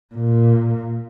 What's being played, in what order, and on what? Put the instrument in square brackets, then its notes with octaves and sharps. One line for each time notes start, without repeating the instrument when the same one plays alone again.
[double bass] A#2